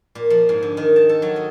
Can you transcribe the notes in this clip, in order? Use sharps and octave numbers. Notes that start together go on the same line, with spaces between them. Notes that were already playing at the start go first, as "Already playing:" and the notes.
A#2
F3
G#2
D3
D#3
A5
A4
F#3
D#5